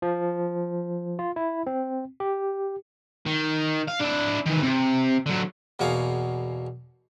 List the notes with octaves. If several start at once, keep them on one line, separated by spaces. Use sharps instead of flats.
F3
F4
E4
C4
G4
D#3
F5
D4 E4
D#3 E3
C3
D3 F#3
E2 B2 A#3 G#4 C#5 F5